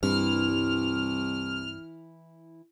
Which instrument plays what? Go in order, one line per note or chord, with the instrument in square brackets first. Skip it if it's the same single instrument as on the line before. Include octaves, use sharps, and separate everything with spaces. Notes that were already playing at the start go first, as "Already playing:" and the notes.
[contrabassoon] C2 [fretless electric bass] G2 [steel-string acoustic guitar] E3 E4 [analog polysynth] F6